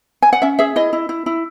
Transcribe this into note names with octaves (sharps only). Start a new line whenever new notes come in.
G#5
F#5
C#4 E5
G#4 E5
E4 D#5
E4
E4
E4